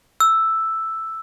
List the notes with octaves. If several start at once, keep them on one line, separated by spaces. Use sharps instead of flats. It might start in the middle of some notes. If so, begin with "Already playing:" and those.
E6